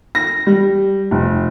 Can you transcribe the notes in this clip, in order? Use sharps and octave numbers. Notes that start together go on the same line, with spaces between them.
A#6
G3
F1